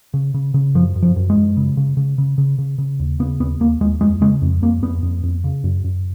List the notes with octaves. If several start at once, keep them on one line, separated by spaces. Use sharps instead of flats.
C#3
C#3
C#3
F#2 F3
F#2
F3
F#2
G#3
F#2
C#3
C#3
C#3
C#3
C#3
C#3
C#3
D#2
C#3 B3
D#2 B3
D#2 A#3
D#2 G#3
F2 G#3
C#3 G#3
F2
F2 A#3
F2 B3
F2
F2
C#3
F#2
F#2